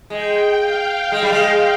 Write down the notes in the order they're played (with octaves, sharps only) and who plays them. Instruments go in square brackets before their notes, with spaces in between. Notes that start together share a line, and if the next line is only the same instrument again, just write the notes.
[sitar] G#3 [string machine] G5
[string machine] F5
F5
[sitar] G#3
G3
G#3